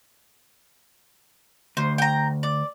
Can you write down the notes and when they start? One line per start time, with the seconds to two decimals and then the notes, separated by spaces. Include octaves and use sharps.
1.77 D2 C5
1.98 G5 A#5
2.43 D5